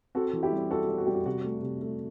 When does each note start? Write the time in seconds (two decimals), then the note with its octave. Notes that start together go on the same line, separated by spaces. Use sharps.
0.15 C4 F#4 A4
0.33 E3
0.43 E4 G4
0.53 G3
0.71 C4 F#4 A4
0.89 G3
0.98 F#4
1.06 G3 G4
1.14 F#4
1.26 C3 F#4
1.44 A3
1.63 C3
1.82 A3